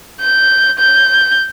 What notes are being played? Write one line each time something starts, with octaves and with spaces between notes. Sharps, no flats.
G6
G6